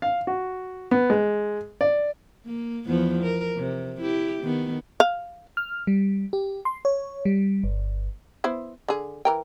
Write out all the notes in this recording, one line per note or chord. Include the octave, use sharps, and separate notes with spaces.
F5
F#4
B3
G#3
D5
A#3
E2 F3 B3
A#4
C3
E4 G4
D#3 B3
F5
F6
G3
G4
C6
C#5
G3
G1
B3 E4 C5
D3 G#4
E3 A#4 G5